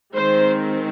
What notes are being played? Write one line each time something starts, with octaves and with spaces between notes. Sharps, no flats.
D#3 G#3 C4 C5